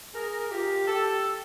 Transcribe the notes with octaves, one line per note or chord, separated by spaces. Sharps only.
G#4 A#4
F4 G4
G4 A4